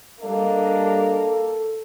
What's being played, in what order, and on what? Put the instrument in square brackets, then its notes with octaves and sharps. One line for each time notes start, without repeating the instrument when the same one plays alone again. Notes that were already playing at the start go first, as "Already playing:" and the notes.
[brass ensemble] G3 D4 D#5 [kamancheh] A#3 [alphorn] A4